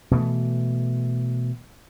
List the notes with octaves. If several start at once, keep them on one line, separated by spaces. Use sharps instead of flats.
B2 E3 A3